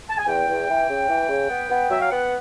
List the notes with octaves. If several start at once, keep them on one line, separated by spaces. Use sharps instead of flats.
A5
G#5
E2 G5
E2
E3
C#3
E3
C#3
B3
B3
F#3 E5
F5
B3 F#5